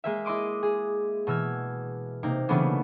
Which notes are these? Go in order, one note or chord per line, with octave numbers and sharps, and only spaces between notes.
G#3 A#3 E5
E4 D#5 C6 D6 D#6
G#4
B2 E3 E6 F6 G#6
C3 A#3 D#4
C#3 E3 F#3 A3 B3 D4